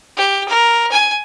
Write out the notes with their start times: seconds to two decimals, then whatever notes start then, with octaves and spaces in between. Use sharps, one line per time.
0.17 G4
0.48 A#4
0.92 G#5